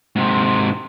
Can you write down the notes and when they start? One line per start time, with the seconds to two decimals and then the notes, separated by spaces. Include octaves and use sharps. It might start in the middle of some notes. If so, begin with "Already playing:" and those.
0.16 G#2 C3